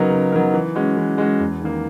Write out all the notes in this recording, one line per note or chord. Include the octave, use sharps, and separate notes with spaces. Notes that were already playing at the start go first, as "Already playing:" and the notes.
Already playing: C#3 F#3 B3 D#4 A#4
C#3
F#3 B3 D#4 A#4
E3
G#3 C#4 F#4
E3
G#3 C#4 F#4
E2
D#3 A#3